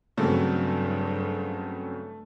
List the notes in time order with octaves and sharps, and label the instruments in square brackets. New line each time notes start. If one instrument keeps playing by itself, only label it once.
[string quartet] G2 [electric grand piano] C#3 F#3 C4 [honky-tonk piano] A3